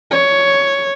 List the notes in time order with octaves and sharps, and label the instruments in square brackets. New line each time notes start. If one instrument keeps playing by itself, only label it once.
[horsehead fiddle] C#5